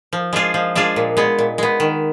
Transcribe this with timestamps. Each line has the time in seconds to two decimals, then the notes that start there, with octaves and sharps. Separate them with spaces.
0.13 F3
0.33 G#3 D4 F4 G#4
0.54 F3
0.75 G#3 D4 F4 G#4
0.96 A#2
1.17 G#3 B3
1.38 A#2
1.58 G#3 B3
1.80 D#3